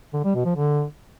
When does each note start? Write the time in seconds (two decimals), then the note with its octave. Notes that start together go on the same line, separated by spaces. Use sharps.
0.14 D3
0.24 G3
0.35 B2
0.45 F3
0.56 D3